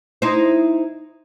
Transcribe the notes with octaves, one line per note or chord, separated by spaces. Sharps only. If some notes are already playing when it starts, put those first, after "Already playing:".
D#4 E4 C5